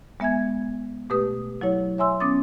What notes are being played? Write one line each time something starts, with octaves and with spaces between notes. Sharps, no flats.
G#3 B3 E5 G#5 G#6
B2 A3 G4 B4 D#6
F#3 E4 C#5
C#5 E5 G#5 C6 E6
B3 C#4 D6 D#6 A6